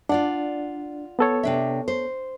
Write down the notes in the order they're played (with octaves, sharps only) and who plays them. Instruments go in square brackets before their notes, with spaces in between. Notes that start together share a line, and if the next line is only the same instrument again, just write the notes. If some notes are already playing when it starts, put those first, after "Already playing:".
[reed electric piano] D4 [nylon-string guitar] F4 D5 F#5
[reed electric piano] B3 A4 C#5
[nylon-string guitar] C3 D4 E5
C5